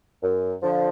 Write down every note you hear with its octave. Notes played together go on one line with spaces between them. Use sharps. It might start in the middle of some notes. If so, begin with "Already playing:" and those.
F#2
D3 F3